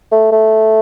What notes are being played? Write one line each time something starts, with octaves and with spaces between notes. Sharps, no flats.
A3
A3